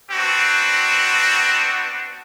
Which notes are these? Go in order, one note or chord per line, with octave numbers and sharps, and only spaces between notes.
B3 C4 D4 F#4